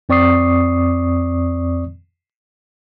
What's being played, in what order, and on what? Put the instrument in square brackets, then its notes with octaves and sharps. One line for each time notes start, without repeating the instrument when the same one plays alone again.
[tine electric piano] F2 C4 D5 C#6 D#6 C7